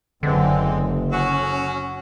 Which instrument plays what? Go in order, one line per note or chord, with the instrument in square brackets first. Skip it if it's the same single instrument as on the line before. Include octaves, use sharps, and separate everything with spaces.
[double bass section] F#1 [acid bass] D3 [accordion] E3 G#3 C4
[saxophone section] F#3 F#4 [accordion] C#4